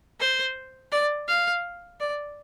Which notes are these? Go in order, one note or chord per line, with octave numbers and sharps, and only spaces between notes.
C5
D5
F5
D5